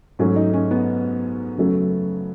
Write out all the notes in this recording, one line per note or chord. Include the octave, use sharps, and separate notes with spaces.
G#2 F#3 A3 C#4
D#4
C#4
B3
F#2 C#3 F#3 A3